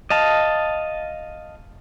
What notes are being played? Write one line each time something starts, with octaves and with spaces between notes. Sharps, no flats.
D#5 F5 A5